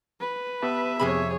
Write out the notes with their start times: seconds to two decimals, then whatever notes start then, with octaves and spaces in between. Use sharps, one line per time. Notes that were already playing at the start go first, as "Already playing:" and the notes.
0.20 B4
0.62 B3 G4 E5 A5
1.00 F2 C3 G#4 C#5 B5